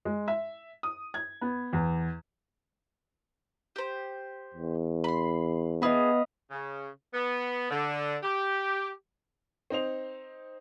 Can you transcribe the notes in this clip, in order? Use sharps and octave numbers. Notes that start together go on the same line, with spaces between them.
G#3
E5
D#6
G#6
B3
E2
G4 C5
E2
B5 C6
B3 D4 G#4 D#5 F5 B5
C#3
B3
D3
G4
C4 D#4 C5 F7